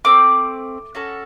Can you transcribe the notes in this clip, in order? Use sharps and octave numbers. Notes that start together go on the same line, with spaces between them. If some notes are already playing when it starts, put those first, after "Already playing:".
A3 C4 D6
C#4 F#4 A4